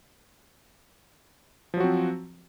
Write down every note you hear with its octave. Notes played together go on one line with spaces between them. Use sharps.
F3 F#3 C4 F#4